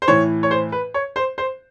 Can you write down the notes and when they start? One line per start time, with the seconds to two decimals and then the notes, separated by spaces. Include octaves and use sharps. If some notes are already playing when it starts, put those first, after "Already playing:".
0.02 C5
0.08 A2 E3 C#5
0.43 C#5
0.51 C5
0.72 B4
0.94 C#5
1.16 C5
1.38 C5